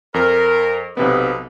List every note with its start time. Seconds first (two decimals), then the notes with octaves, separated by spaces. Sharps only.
0.14 F2 A#4
0.97 B1 C3 B3 D#4 A4 B4